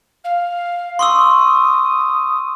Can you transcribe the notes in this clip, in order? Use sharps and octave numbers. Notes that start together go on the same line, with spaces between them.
F5
C6 C#6 D#6 E6